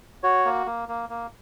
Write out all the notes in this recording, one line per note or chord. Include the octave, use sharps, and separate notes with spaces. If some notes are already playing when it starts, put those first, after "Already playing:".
F#4 C#5
A#3
A#3
A#3
A#3